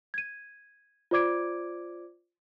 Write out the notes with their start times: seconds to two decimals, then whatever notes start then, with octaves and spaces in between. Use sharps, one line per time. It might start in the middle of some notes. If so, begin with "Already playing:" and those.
0.14 G#6 D#7
1.11 F4 C5 D5 D6 G#6 D7